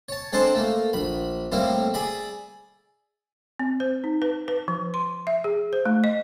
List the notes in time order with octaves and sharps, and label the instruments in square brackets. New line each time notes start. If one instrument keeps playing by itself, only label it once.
[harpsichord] C#5 A5
G#3 C4 D4 A4 C5 D5
A3 A#3
A#1 B5
A2 G3 A#3 C4 E4
G#4 D5 E5 B5
[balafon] C4
C5
D#4
B4
B4
F3
C6
E5
G#4
C5
A3
D#5